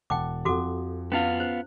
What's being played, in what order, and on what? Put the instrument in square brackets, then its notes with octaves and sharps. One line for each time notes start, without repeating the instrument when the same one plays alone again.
[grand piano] E1 F#5 A5 [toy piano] G5 D6
[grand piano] F2 F3 F#5 [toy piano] F#4 A4 D6
[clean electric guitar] B3 F4 F5 [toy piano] C#4 E4
[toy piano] C5